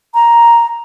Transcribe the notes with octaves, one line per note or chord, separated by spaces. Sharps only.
A#5